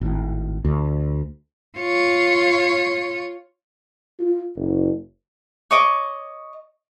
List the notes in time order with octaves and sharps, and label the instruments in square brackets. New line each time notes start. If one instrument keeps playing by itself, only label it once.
[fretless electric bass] G#1 A2
D2
[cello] F4 C#5
[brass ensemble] F4
F#1
[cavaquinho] C#5 D#5 D6